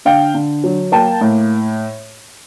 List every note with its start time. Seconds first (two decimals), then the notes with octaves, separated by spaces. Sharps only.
0.05 D3 F5 G5
0.35 D3
0.64 F#3
0.92 A#3 G5 A5
1.21 A2